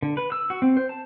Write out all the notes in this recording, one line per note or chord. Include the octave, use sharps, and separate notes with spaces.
D3
B4
E6
F#4
C4
C5
A5